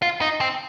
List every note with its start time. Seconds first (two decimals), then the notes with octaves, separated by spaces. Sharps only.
0.02 F4
0.21 D#4
0.41 C4